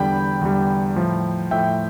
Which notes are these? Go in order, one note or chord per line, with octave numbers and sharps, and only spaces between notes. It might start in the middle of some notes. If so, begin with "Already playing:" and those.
Already playing: E2 D3 G3 G5 B5
E2 D3 G3
A2 F3
A2 F3 E5 G5